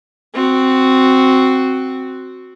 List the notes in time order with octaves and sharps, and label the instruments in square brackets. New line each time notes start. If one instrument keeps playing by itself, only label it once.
[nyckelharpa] C4 F#4